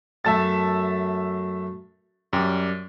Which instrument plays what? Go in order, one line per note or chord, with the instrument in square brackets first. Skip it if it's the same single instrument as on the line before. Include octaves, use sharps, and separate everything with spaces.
[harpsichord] F#2 A3 [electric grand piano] E5 A5 A6
[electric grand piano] F#2 [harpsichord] G3